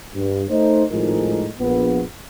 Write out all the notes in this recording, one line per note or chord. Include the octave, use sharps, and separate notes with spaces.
G2
A3 D#4 C5
G#1 A2 F3 G#3 D#4 A#4
A#1 F3 B3